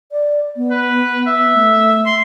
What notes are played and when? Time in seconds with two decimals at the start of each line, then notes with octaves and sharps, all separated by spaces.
0.12 D5
0.57 B3
0.71 B4
1.27 E5
1.54 A3
2.06 C6